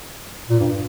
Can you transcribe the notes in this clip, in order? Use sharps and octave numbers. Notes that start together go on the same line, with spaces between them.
A#2
G2